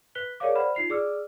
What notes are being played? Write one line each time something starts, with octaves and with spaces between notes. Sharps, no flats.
B4 F#6 B6 G7
G#4 A#4 C#5 D5 F5 D6
C5 D5 F#5 B5 F6
D#4 F4 C7 F7
G#4 D5 D6 E6 F6